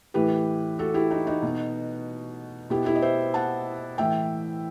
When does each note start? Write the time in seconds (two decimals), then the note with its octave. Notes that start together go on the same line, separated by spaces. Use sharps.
0.14 A2 E3 G4 B4
0.79 F#4 A4
0.94 E4 G4
1.11 D#4 F#4
1.27 D#4 F#4
1.43 B2
2.70 B2 E4 G4
2.86 E4 G4
2.95 D#5
3.02 C5 E5
3.34 F#5 A5
3.98 A2 E3 E5 G5